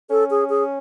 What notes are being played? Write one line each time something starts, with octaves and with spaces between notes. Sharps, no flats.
C#4 A4
G#4
G#4